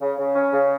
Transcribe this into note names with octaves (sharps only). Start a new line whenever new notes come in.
C#3
C#3
C#4
C#3